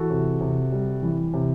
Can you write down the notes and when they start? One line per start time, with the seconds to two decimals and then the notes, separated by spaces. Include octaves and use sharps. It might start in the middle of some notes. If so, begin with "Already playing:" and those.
Already playing: E3 F#4 A4
0.10 C3
0.41 C3
0.72 G3
1.02 E3
1.33 C3